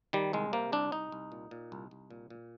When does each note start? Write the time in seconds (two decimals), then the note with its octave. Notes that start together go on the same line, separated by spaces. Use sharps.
0.13 D#3 G3
0.33 C2 G#3
0.53 C3 A#3
0.72 C2 D4
0.92 C2 D#4
1.12 C2
1.32 A#2
1.51 A#2
1.72 C2
1.91 C2
2.11 A#2
2.30 A#2